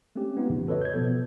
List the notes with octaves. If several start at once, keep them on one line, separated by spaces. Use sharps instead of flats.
G#3 A3 C4 C#4 G4
B3 D#4 F4
F2 A2 C#3 E3 F3
F#4 A4 B4 C#5 D#5
G6 G#6
B2 F3 B3 A4